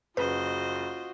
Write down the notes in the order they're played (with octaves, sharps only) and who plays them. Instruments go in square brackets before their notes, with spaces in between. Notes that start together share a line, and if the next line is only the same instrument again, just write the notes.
[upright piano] F#1 [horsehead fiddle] F4 F#4 [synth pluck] B4 [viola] C5 D#5